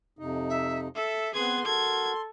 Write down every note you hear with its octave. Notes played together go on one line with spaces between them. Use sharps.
F2 C3 D#4
E5
A4 E5
B3 C4 G#4 B4 C6 G#6
F#4 A4 A#4 G#6